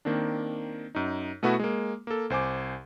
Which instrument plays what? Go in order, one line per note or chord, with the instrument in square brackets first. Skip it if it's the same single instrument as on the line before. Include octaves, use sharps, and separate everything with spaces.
[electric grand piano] D#3 A#3 C4 D4
F#2 D#4
B2 A3 B3 E4 F#4
G#3 A#3
A#3 A4
C2 C5 G#5 D6